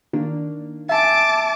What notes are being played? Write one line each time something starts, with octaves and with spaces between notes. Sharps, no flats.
D#3 A#3 D4
E5 G#5 A5 D6